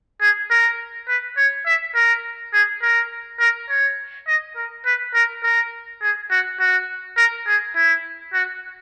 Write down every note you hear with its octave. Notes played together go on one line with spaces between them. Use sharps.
G#4
A#4
B4
C#5
E5
A#4
G#4
A#4
A#4
C#5
D#5
A#4
B4
A#4
A#4
G#4
F#4
F#4
A#4
G#4
E4
F#4